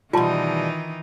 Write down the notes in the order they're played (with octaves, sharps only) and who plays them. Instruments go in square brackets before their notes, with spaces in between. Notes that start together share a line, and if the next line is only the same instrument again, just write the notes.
[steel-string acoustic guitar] B2 G3 [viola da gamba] D#3 E3 D#4 [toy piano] F4 A5 C6